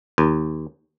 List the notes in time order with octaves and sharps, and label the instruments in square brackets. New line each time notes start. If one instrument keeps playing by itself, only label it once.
[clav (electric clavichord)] D#2